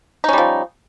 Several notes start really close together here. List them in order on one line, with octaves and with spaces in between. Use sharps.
D#4 C#4 G3 F3